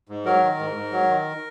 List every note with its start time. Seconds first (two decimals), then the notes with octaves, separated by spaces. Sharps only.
0.09 G#2
0.25 F#3 A#4
0.43 D#3
0.59 G#2
0.76 G#2
0.92 F#3
1.09 D#3